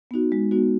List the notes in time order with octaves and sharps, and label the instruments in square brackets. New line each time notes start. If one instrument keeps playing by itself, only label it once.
[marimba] B3 D#4 F#4
G#3
B3 D#4 F#4